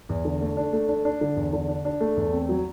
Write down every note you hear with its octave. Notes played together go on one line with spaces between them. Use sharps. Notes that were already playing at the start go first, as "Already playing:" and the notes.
E2
D3
A3
D4
A3
D4
D4
D3
E2
D3
D4
D4
A3
E2
C4
F#3